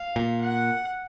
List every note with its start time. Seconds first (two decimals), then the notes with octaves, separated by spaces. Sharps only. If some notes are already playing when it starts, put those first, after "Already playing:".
Already playing: F5
0.16 A#2
0.41 F#5